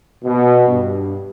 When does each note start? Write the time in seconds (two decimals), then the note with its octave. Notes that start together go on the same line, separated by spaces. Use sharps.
0.24 B2
0.67 G2